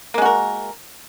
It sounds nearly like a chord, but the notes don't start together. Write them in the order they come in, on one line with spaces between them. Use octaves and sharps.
A#3 G#3 F#4 A#4